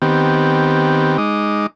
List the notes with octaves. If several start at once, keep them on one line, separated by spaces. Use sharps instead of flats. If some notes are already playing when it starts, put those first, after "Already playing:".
D#3 B3 C4 G4
G#3 D#4 D6 D#6